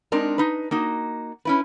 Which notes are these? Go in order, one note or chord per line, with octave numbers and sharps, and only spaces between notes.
G#3 C4 D4 D#4 A#4
D#4 B4
A#3 D#4 F#4
C#4 E4 B4